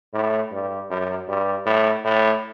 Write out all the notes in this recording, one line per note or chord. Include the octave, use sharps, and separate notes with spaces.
A2
G2
F#2
G2
A2
A2